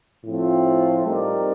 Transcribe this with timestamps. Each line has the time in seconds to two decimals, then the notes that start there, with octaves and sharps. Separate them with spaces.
0.25 A2 F3 A3 C4 F4
1.06 G3 C4 D#4 A#4 D5